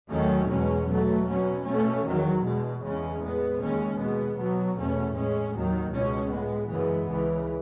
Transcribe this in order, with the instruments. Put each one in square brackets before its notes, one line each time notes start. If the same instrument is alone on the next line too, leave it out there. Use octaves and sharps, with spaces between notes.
[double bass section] D#2 D#3 F#3 A3 C#4
E2 B2 G#3 C#4
B2 F#3 A3
B2 F#3 C#4
B2 A3 C#4
E2 D#3 F#3
E2 B2 G#3
E2 C#3 G#3 C#4
A2 G#3 B3
D#2 C#3 G#3 C#4
B2 G#3 B3
B2 F#3 B3
E2 B2 A3 C#4
A2 G#3 C#4
D#2 D#3 F#3
C#2 B2 G#3 C#4
A2 G#3 B3
F#2 C#3 E3 G#3 B3
C#2 C#3 E3